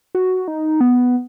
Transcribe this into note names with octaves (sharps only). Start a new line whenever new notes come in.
F#4
D#4
B3